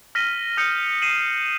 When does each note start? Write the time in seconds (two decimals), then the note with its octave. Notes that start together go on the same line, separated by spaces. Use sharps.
0.15 F6 A#6 B6 D#7 G7
0.57 D#6 G6 A#6 C#7
1.02 C7 D#7 E7 F#7